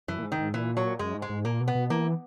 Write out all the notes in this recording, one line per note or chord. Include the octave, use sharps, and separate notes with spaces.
F#2 E3
A#2
G#2
D#3
G#2
A#2 E3
F#3
F#2 G#3
G#2
G#3
G#2
A#2 A#3
B2
B3
B2
E3 A#3